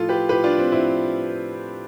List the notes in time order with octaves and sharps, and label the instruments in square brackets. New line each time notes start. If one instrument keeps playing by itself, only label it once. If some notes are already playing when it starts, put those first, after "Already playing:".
Already playing: [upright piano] A2 F3 F4 A4
G4 B4
A2 F3 G4 B4
D4 F4
C4
A2 F3 C4 E4